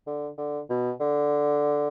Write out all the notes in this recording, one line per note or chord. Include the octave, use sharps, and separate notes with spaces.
D3
D3
B2
D3